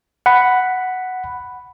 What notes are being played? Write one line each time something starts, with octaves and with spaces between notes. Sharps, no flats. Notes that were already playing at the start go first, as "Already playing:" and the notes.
F#5 B5